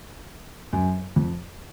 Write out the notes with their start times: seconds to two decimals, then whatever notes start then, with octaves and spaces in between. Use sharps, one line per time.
0.73 F#2
1.16 F2